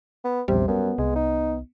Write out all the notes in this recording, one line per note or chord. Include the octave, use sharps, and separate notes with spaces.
B3
A#1 E2 C3 G3
F#2 B3
C2 G#3
D#4